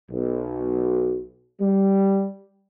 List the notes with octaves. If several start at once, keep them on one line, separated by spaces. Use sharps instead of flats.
B1
G3